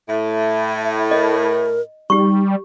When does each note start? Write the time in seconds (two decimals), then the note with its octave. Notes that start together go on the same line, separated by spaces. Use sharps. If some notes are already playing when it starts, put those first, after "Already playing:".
0.08 A2 E5
1.11 A#4 D#5
2.10 G3 D#4 G4 C#6